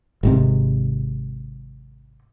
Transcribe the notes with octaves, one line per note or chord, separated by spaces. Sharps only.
G#1 G#2 C3